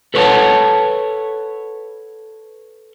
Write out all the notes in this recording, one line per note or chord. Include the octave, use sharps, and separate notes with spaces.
A4 B4 C#5 D#5 F#5 A5